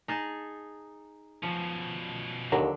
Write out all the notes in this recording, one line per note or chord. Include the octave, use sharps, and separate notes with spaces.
D#4 G#4 A5
B2 F3 C#4
D#2 D3 F#3